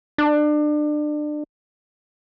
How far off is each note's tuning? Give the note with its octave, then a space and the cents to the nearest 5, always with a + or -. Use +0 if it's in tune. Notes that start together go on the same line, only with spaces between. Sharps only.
D4 +30